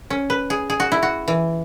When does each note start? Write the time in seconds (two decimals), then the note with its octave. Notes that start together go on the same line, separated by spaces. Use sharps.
0.10 C#4
0.30 B4
0.50 G#4
0.70 G#4
0.80 F#4
0.92 E4
1.03 F#4
1.28 E3